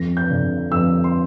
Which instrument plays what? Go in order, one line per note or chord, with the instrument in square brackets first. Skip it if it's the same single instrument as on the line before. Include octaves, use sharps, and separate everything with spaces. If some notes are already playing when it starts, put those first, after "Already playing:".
Already playing: [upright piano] F2 A#6
G6
D3
F2 E6
C6